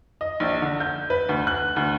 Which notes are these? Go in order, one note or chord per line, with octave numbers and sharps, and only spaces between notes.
D#5
A#1
D3
G6
B4
D2
F#6
D2